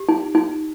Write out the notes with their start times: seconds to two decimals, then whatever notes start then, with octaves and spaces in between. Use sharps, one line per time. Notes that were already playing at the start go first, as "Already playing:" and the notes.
Already playing: G4
0.08 D#4
0.35 D#4